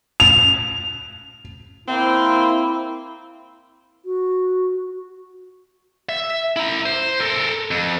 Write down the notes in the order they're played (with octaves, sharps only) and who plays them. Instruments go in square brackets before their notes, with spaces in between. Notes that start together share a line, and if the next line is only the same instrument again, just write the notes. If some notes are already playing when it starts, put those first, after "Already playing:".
[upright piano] F7
[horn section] A#3 C4 [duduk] E4
[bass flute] F#4
[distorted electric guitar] E5
E4 A#5
C5
A4 A#4
F2